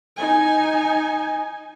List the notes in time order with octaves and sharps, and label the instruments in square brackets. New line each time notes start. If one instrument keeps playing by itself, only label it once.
[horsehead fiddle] D#4 G#5